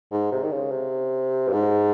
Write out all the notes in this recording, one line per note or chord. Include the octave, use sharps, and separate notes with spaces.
G#2
C3
D#3
C#3
C3
G2
G#2